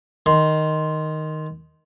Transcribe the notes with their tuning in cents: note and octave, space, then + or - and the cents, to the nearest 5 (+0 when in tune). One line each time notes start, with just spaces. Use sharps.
D#3 +0 C6 +0